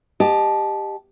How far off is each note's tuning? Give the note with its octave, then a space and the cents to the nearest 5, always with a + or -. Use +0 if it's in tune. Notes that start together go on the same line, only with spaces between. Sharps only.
G4 +15 D#5 -20 A5 -20